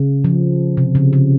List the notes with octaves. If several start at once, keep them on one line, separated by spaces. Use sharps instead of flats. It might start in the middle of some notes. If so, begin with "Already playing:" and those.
Already playing: C#3
F3
C3
C#3
C#3